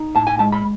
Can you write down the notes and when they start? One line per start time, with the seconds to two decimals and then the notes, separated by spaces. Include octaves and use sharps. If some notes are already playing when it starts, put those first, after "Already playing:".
Already playing: D#4
0.15 A2 A5
0.27 G#5
0.39 G#3 A5
0.52 B5